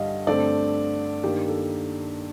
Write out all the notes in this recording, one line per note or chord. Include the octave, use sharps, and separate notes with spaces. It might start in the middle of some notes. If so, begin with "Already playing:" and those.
Already playing: G2 D3 G3 D#5 F5
G2 D3 A3 C4 D5
G2 D#3 A#3 G4
A4